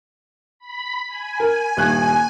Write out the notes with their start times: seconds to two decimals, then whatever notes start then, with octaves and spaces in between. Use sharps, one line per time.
0.59 B5
1.08 G#5
1.40 A#4
1.77 D#1 G2 F#6